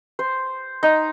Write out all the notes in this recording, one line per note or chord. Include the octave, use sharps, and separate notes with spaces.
C5
D#4